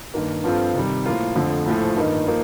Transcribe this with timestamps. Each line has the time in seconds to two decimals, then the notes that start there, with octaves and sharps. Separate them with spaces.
0.14 G2 D#3 A#3
0.44 G2 F3 C4 F4 A4
0.75 C3 D#3 G3
1.05 A2 F3 A#3 F4 A#4
1.36 F2 D3 F3 A3
1.66 A#1 A2 F3 A3
1.97 G2 D#3 A#3 D#4
2.27 F3 A#3 D#4